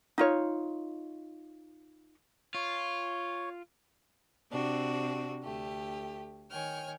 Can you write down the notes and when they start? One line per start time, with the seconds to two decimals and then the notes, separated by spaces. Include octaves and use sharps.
0.18 D#4 F4 C#5
2.54 F4 C#5
4.50 C3 C4 D4 F#4
5.42 D2 A3 G4
6.51 D#3 C#5 G5 G#5 F6